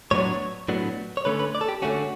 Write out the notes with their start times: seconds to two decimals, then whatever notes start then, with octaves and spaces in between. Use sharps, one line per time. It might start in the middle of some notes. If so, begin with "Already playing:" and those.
0.11 A2 F#3 B3 D4 C#5
0.68 A2 F#3 B3 D4
1.17 C#5
1.25 D3 A3 C#4 B4
1.39 B4
1.55 D5
1.61 A4
1.68 G4
1.82 D3 A3 C#4 F#4